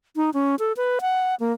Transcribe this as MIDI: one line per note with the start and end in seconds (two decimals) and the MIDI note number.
0.16 0.30 63
0.34 0.56 61
0.59 0.72 69
0.77 0.99 71
1.01 1.35 78
1.40 1.53 58